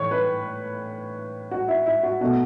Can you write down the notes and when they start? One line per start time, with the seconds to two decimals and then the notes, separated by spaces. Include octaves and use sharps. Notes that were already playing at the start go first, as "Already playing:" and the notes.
Already playing: A2 E3 C#5
0.11 B4
1.51 F#4
1.68 E4
1.86 E4
2.03 F#4
2.21 B2 A3 F#4